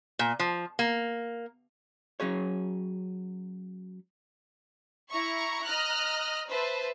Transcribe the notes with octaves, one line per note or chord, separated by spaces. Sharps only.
A#2
F3
A#3
F#3 C#4 G#4 C#5
E4 A#5 C#6
D#5 A#5 F6 F#6
B4 C5 E5 A5